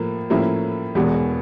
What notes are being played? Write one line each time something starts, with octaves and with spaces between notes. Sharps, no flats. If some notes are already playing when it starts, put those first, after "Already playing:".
Already playing: A2 F3 A#3
A2 F3 A#3 C#4 E4
E1 E2 B2 G#3 B3